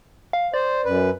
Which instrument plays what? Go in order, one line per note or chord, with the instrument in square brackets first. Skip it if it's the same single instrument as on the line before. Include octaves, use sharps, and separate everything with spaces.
[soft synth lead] F5
[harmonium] C5 [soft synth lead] D5
[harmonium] F#2 B4